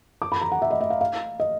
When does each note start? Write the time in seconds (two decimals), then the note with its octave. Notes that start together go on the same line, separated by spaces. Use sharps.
0.22 D6
0.32 B5
0.41 A#5
0.52 F#5
0.62 E5
0.70 D#5
0.81 E5
0.90 F5
1.01 F5
1.40 D#5